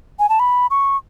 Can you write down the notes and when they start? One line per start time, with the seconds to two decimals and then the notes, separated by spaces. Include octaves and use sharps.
0.19 G#5
0.29 A5
0.39 B5
0.70 C#6